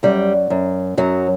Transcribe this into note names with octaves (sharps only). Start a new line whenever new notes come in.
F#2 G3
F#2
F#2 F#3